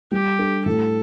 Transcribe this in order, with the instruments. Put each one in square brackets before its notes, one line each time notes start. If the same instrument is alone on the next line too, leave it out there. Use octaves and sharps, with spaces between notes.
[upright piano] G3 [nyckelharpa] G4
[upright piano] D4 A4
[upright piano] A2 [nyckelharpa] A4